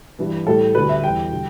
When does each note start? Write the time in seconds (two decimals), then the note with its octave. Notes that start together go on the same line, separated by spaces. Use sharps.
0.19 G2 E3 G3
0.47 A2 G3 A4
0.75 D2 D3 G3 B4
0.89 E5
1.04 E2 E3 G3 G5
1.32 D3 G3